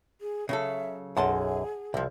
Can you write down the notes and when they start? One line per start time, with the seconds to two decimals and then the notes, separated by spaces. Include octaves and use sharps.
0.21 G#4
0.49 C#3 F#3 A4 E5
1.17 B1 F#2 G#4 F#5 A5 C6
1.94 C2 C3 F3